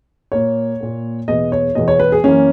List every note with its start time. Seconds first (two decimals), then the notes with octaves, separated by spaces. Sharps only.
0.32 A#2 A#3 C#5
0.80 A#2 A#3
1.28 E2 B2 G#3 B3 D#5
1.52 C#5
1.75 E2 B2 G#3 B3 D#5
1.88 C#5
2.00 B4
2.12 G#4
2.24 F#2 E3 A#3 C#4